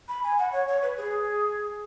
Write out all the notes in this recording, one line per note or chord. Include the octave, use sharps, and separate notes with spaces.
B5
G#5
F#5
C#5
C#5
B4
G#4